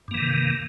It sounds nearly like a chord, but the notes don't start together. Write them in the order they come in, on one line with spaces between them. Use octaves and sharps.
G2 A#3 E3 D#3 C3